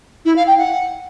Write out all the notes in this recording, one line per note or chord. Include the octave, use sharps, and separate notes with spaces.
E4
F5
G5
F#5